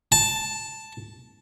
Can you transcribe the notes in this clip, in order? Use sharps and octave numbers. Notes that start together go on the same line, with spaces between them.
A5